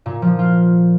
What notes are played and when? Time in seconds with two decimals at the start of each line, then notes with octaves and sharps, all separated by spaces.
0.06 A#2
0.22 F3
0.39 F4